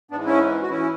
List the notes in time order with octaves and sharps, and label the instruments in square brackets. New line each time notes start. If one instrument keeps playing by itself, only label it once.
[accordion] G#2 B3 D4
E3
C#4 E4
F#4
E3 C#4 E4